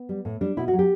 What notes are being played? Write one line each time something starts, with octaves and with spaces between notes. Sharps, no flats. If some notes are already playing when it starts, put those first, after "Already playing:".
Already playing: B3
G3
A2
G3 D4
B2 E4
F#4
F#3
G4